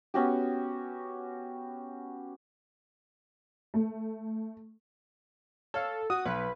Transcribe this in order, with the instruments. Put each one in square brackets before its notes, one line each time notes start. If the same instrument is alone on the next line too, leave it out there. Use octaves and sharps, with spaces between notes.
[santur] B3 C#4 F#4 G4
[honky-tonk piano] A3
[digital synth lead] A4 [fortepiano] C#5 F5
[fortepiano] F#4 [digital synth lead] D#6
[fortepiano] B1 [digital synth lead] B4